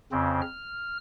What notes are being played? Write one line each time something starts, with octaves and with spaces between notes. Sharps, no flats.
F2 C#3 C4
F6